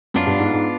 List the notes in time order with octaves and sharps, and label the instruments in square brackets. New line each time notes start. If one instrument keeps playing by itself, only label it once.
[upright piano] F#2 [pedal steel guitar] B3 D4 F4
[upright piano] G2
G#2
G#2